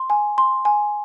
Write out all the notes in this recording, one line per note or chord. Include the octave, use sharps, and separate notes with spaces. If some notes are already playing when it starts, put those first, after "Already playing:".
Already playing: C6
G#5
C6
G#5